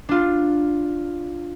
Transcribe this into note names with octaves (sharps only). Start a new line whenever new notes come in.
D4 F4